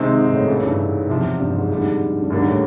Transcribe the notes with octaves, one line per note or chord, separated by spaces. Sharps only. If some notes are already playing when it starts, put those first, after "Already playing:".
Already playing: C3 D#3 G#3 C4 D#4
G#2
G#2
A2
G#2 C#3 E3 A3
G2
G#2
E2 C3 F3
G2
G#2
F2 G#2 D3 G3
G2
D#2 G#2 D3 G3 A#3
A2